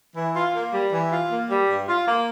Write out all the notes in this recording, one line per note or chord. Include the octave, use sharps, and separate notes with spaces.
E3
F4
A#3
G3
E3
F4
A#3
G3
G2
F4
A#3